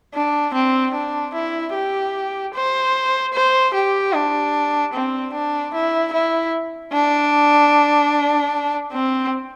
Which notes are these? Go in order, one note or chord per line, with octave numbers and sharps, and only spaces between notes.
D4
C4
D4
E4
G4
C5
C5
G4
D4
C4
D4
E4
E4
D4
C4